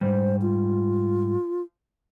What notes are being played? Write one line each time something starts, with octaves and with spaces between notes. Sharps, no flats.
G#2 C3 G3 C5
F4